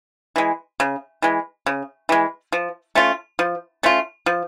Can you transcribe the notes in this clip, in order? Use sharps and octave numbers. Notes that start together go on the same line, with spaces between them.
E3 G#3
C#3
E3 G#3
C#3
E3 G#3
F3
A3 C#4 F4
F3
A3 C#4 F4
F3